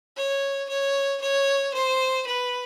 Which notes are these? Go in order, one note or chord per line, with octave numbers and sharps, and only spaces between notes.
C#5
C#5
C#5
C5
B4